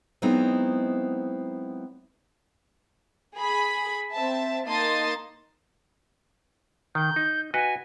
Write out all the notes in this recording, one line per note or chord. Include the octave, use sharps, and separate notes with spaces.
F#3 G#3 B3 C4 D#4 E4
G#4 B5
C4 E5 A5
A#3 D#4 A5 C6 D#6 A6
D#3 G6
D#4
F#4 B4 D#5 G#5